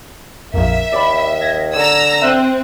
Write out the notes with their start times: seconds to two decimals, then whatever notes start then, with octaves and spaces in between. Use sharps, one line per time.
0.54 A#1 F2 A#3 E5
0.92 D#2 D5 B5
1.40 G#6 A#6
1.76 D3 A#5 E6
2.22 C4 E5 F#6 D#7